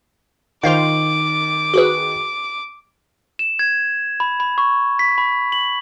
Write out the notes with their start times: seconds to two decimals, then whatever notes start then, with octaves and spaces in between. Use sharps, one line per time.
0.63 D#3 F4 C5 F5 D6
1.74 F#4 G#4 B4
3.39 E7
3.59 G#6
4.20 B5
4.40 B5
4.58 C#6
4.99 B6
5.18 B5
5.52 F#7